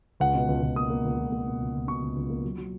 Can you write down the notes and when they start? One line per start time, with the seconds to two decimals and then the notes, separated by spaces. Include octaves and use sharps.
0.20 C#2 F#5
0.35 B2
0.48 C#2
0.63 C#2
0.76 A#3 D#6
0.90 A#3
1.05 C#2
1.18 C#2
1.32 A#3
1.47 B2
1.60 C#2
1.75 C#2
1.88 B2 C#6
2.02 C#2
2.16 C#2
2.30 A#3
2.44 F#3
2.58 F#3